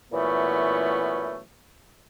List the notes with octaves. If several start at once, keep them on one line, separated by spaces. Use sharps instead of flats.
A#2 E3 F#3 A3 B3 C#4